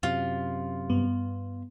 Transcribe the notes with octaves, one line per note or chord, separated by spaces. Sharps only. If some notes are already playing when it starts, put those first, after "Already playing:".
F#2 C3 F4
G2 B3